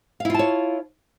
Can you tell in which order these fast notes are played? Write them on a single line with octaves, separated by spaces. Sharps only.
F5 E4 F4 A5 C#5